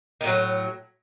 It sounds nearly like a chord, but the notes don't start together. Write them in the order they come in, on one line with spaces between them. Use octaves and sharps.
D#3 A2 F#3